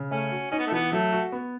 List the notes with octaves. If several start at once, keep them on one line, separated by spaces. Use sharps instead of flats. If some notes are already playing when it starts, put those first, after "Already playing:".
Already playing: C#3
A3 C#4
F#4
C#4 D#4
B3
A3
E3 B3
F#3 A3
F#4
B3